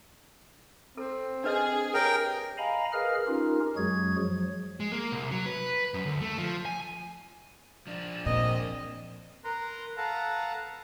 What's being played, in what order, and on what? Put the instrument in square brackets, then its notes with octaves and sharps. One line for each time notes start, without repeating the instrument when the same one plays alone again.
[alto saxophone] C4 [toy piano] A4
[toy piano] D4 B4 D#5 [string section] G#4
[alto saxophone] G4 [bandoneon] A#4 G5 [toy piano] B4 C#5 D#6
[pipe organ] D#5 F5 G#5 A#5 B5
G#4 A#4 B4 D#5 F5 F6
C#4 D#4 F4 G4 A#4
F#2 F#3 G#3 F#4 G#4 G#6
F3 F#3
[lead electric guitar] G#3
A#3
C2
F#3
B4
F#2
D2
A3
F3
G#5
[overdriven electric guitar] F3 D4
[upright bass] A#2 [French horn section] A#3 C4 [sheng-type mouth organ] D#5
[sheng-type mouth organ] A#4 B4 A#5 C6
A4 B4 F5 F#5 A5 A#5